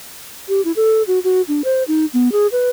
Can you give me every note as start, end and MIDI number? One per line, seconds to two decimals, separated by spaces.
0.49 0.61 67
0.65 0.72 64
0.76 1.03 69
1.07 1.19 66
1.24 1.42 66
1.48 1.64 62
1.64 1.83 72
1.88 2.06 63
2.14 2.32 59
2.32 2.47 68
2.52 2.70 71